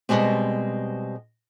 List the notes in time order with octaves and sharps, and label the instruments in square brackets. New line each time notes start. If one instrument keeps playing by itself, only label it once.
[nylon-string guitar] B2 F3 G3 G#3 C4